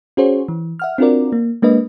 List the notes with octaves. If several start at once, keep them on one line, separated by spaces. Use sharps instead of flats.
C#4 F#4 G#4 C5 C#5
E3
E5 F#5 F6
C4 D4 F4 F#4 A#4 D5
A#3
G#3 A#3 D4 B4 D#5